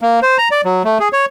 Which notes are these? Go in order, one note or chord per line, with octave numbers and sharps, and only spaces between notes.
A#3
C5
A#5
D5
F#3
A3
G#4
C#5